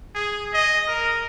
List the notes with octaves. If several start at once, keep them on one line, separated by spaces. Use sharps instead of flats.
G#4
D#5
A#4